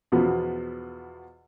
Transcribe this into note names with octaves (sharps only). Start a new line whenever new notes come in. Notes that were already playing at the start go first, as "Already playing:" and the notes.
E2 B2 F3 B3